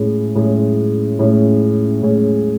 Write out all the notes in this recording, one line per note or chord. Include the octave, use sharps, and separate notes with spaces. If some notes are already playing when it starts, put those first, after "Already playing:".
Already playing: A2 G#3 C#4 G#4
A2 G#3 C#4 G#4
A2 G#3 C#4 G#4
A2 G#3 C#4 G#4